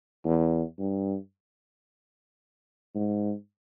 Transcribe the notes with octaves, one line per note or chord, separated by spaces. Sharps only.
E2
G2
G#2